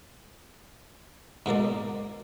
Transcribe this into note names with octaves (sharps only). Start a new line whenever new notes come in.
G#2 B2 A#3 D5